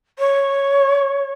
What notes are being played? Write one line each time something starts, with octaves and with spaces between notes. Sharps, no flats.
C#5